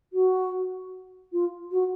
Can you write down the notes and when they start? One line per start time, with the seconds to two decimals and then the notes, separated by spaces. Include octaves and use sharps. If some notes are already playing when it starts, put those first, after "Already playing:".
0.13 F#4
1.32 F4
1.72 F#4